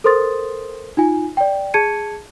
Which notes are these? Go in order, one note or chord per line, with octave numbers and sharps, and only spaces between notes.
A4 A#4 C5 C6 D#6 A6
D#4 F4 G#5
D5 G5
G#4 A5 G#6 C#7 D#7